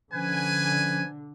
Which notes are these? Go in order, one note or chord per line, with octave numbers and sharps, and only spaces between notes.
D3 F3 C#4 B4 G#5